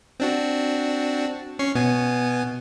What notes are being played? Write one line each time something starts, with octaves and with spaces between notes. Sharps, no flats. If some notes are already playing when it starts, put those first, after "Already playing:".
C4 D4 F#4
C#4 C#6 C7
B2 B3 G#5